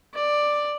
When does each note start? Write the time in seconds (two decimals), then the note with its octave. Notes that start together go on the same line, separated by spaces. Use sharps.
0.14 D5